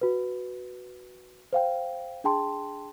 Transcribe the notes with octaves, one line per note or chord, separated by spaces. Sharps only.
F#4 B4
C5 F5 G5
D4 G#4 G5 A5 C6